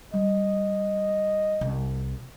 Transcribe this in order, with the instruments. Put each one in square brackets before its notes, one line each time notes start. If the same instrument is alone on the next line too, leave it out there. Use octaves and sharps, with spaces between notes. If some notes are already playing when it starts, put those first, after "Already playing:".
[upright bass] G3 [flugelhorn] D#5
[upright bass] C2